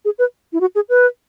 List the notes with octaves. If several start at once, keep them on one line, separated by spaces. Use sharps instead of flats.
G#4
B4
E4
F#4
G#4
B4